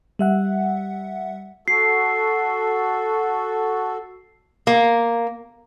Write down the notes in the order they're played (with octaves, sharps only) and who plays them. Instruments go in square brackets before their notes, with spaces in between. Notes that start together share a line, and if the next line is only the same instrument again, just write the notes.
[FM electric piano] G3 E5 F#5
[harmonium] F#4 A4 [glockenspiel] C7
[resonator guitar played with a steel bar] A#3